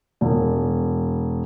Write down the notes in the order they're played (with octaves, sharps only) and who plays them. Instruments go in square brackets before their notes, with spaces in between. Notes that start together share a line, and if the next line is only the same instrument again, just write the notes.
[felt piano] E1